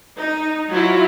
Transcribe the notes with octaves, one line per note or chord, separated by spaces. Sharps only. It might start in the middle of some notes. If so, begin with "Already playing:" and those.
D#4
F#3 E4 F4